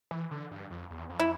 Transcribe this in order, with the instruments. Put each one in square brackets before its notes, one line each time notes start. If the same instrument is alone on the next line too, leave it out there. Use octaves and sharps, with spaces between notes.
[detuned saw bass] E3
D3
G2
F2
E2
F2
[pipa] E4